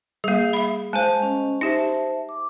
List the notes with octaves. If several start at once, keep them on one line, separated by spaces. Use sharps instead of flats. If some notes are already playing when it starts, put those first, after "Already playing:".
G3 A#3 G#4 F5
E5 B5
G#3 C5 G#5 A5
C#4 D#5
D#4 G4 C5 E5 A5 A#6
D6